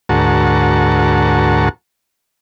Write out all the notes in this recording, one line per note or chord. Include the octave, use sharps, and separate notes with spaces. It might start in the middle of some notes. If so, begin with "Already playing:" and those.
D2 G#2 F#4 A#4 A5 C#6